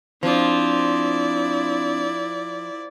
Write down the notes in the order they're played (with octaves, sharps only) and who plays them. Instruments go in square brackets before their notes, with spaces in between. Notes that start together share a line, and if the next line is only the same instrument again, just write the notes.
[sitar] F3 [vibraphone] C4 D4 D#6 [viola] E4 D5